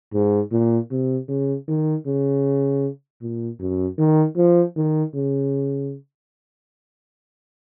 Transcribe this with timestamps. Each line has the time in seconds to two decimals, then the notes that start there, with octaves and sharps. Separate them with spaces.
0.13 G#2
0.52 A#2
0.91 C3
1.28 C#3
1.68 D#3
2.06 C#3
3.22 A#2
3.60 F#2
3.98 D#3
4.37 F3
4.76 D#3
5.14 C#3